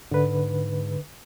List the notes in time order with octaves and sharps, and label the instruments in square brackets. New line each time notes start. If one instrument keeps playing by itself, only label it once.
[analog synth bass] G#2 [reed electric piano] D3 B4